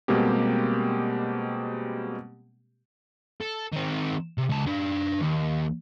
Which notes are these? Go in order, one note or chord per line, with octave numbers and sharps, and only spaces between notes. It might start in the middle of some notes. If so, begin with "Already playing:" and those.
B2 G3 G#3 A#3 C4 G4
A4
D#3 C4
C3
C#2 A5
D4 B4
D#2